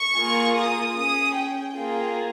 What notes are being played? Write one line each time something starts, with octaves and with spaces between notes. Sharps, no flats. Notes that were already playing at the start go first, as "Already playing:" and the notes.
Already playing: C#6
A#3 F4 G#4
D#6
C#4 G#4 D#6
G5
A#3 F4 G#4